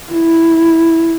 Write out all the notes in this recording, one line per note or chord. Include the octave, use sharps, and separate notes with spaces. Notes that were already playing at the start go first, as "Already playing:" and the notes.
E4